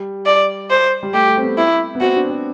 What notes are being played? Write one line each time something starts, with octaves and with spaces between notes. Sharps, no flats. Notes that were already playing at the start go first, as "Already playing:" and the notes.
Already playing: G3
D5
C5
G3
A3 G4
A3
C4
B3
E4
B3
C4 F#4
D4
C4